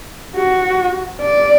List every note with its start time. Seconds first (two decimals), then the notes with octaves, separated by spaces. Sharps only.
0.36 F#4
1.21 D5